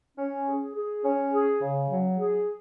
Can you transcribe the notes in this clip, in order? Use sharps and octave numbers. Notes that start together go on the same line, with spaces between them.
C#4
G#4
G#4
C#4
G#4
C#3
F#3
G#4